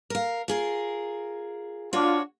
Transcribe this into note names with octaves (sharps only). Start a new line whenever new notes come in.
A#4 F5
F4 G#4 A#4
D4 F4 F#4 C#5